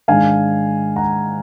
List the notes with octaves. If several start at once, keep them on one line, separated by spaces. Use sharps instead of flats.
G#2 D#3 G#3 D4 F5 G#5
F#5 A#5